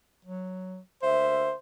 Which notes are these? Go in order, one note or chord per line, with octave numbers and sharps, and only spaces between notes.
F#3
D2 A#3 C5 E5